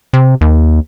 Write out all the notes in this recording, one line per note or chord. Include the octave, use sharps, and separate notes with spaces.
C3
D#2